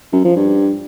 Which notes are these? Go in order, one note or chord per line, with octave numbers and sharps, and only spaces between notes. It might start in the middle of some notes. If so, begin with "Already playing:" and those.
F#2
F3
G2